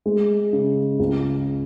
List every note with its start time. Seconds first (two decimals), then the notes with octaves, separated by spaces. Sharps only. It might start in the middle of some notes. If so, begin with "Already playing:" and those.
0.06 G#3
0.53 C#3
0.99 C#2